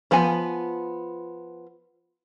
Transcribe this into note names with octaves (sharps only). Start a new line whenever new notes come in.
F3 B3 F4 G#5